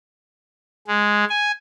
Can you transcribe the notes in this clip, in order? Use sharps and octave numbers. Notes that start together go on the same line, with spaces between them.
G#3
G#5